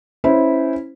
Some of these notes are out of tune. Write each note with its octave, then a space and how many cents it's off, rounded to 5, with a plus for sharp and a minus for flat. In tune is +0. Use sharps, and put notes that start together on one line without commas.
C#4 -20 E4 -15 C5 -20